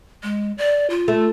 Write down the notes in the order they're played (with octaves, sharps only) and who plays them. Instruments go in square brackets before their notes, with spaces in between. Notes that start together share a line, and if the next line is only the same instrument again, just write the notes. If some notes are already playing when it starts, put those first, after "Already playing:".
[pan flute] G#3
D5
F4
[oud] A3